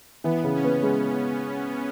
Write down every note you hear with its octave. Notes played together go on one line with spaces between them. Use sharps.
E3 B3
C#3
C#4
B3
G#3